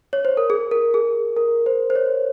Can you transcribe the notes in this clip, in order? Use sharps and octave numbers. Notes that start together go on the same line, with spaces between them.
C#5
C5
A#4
G#4
A#4
G#4
A#4
C5
C5
C#5